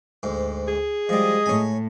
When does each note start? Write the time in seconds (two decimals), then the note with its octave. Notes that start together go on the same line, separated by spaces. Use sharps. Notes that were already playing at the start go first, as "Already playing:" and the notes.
0.23 D2 G#2
0.68 G#4
1.09 F3 G3 G#3 D#5
1.46 A2 C#5 G#5